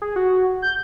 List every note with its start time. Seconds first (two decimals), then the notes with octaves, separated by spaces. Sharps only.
0.02 G#4
0.16 F#4
0.62 G6